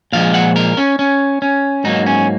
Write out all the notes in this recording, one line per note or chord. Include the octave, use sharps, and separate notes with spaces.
A#2 F3 G#3 F5
F#5
A#4
C#4
C#4
C#4
G#2 F#3 A#3 D#4
C#4